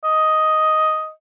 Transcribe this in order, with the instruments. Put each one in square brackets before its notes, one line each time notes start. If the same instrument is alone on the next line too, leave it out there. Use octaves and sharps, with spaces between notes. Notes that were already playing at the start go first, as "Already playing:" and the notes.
[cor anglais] D#5